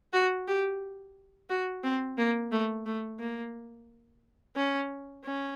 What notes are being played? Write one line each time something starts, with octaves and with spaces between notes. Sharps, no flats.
F#4
G4
F#4
C4
A#3
A3
A3
A#3
C#4
C#4